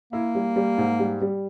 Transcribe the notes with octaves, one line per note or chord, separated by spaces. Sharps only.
A#3 E4
G3
G3
G#2
G3
G3